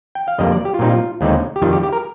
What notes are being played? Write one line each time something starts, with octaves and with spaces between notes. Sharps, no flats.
G5
F5
F2 D3 G3 A#3 D#5
D5
G4
F4
A#2 G3 C4 D#4
F4
D#2 D3 G#3 C4 D#4
G4
F2 D#3 G3 F4
G4
G4
A#4